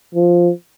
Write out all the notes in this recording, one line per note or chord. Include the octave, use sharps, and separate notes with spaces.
F3